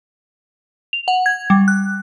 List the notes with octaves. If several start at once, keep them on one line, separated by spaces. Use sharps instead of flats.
F7
F#5
G#6
G3
F#6